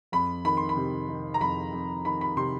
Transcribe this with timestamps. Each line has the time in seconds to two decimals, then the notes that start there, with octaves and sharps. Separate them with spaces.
0.12 F2 B5
0.45 D#3 B5
0.57 C6
0.69 B5
0.77 C3
1.09 D#3
1.34 A#5
1.41 F2 B5
1.72 F2
2.05 D#3 B5
2.21 B5
2.37 C3 C6